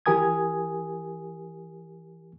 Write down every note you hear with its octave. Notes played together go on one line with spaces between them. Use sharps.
E3 G4 A#4 G#5 D#6 G#6